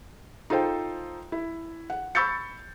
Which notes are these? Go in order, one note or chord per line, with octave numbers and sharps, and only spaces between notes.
D#4 F4 A4 C5 G5
E4
F#5
B5 C#6 E6 G6 A6 C#7